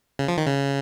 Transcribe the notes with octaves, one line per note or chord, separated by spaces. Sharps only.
C#3
F3
D#3
C#3